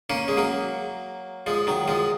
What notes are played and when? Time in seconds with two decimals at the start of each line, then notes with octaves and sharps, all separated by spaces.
0.10 A#3 C#4
0.28 G#3
0.37 F#3 A#3
1.46 F3 G#3
1.67 D#3 F#3
1.88 F3 G#3